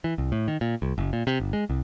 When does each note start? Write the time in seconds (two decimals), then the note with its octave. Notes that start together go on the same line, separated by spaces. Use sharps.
0.04 E3
0.18 C2
0.32 A2
0.48 D#3
0.61 A#2
0.82 C2
0.98 F#1
1.13 A#2
1.27 C3
1.40 G1
1.53 G#3
1.70 C2